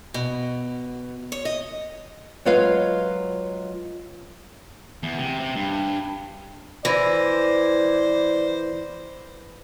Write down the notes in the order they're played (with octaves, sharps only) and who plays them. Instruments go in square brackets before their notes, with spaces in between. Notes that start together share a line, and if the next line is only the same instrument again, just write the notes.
[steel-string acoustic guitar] B2
C#5
D#5
[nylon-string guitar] F#3 G#3 F4 B4 C#5 F5
[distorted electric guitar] E2
C3
C3
G2
[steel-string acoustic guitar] E3 [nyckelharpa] C5 [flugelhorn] D5 [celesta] B5 E6 A#6